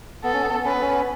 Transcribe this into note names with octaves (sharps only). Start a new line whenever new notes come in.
B3 A4
C#4
B3
C#4 B4
B3
C#4